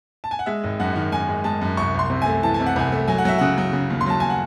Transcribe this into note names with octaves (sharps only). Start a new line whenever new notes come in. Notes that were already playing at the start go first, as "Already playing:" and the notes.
A5
G#5
F#5
G#3 E5
G#1
F#2 F#5
D#3
F#2 G#5
G#3
G#3 A5
F#2
C2 C#6
C2 C6
C3
A3 G#5
E3 A5
G#5
C3
F#5
C2 G#5
A3
F#3 G#5
F#5
F#3 E5
C#3 F#5
F#3
C#3
D#2
C6
F#3 A5
G#5
F#5